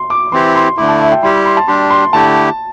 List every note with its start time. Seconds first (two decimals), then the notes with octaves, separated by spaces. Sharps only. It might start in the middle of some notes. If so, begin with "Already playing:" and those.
Already playing: C6
0.10 D6
0.32 E3 C4 E4 G4 C6
0.56 C6
0.77 D3 A3 E4 D6
0.89 A5
1.00 E5
1.12 G5
1.23 G3 E4 G4 C6
1.46 C6
1.57 A5
1.68 G3 D4 G4 C6
1.90 C6
2.13 D3 A3 E4 G4 A5